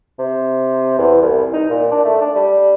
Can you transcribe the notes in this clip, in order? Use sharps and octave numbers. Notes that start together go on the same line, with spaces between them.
C3
E2
C2
D#4
A#2
D4
A3
D4
G3